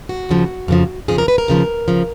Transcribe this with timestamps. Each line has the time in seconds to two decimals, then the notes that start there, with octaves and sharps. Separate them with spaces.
0.09 F#4
0.29 D#2 C#3 F3
0.68 F2 C#3 F3
1.08 F2 C#3 F3 G#4
1.18 A#4
1.28 B4
1.38 A#4
1.48 D#2 C#3 F3
1.88 C#3 F3